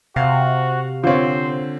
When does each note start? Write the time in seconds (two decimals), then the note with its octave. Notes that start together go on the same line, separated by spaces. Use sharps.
0.16 C3 F#4 F5
1.04 D3 C4 F4 C5 C#5